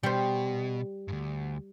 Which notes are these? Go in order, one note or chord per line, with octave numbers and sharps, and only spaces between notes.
B2 G3 C5
D2 G2